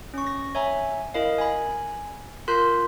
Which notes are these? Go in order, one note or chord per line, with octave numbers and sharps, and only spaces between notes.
C#4 C#6
A#6
C#5 E5 G#5 A#5
E4 A#4 D#5 F5
G#5 B5
F4 A#4 C6 F#6 G6 B6